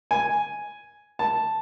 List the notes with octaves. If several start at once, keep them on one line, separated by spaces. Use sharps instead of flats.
G#5
A5